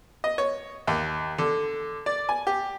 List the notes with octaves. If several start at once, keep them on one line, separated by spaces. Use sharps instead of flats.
D#5
C#5
D#2
D3
D5
G#5
G4